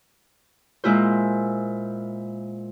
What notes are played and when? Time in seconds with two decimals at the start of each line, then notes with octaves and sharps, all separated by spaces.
0.84 A#2 G#3 E4 F4 C5